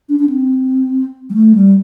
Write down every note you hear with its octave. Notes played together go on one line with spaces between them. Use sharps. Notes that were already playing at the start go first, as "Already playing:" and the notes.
D4
D4
C4
G3
A3
G3